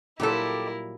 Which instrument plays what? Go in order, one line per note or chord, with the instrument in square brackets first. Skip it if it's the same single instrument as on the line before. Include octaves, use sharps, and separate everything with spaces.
[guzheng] A#2 F#3 G3 [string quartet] E4 A#4 [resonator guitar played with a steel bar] G4 A4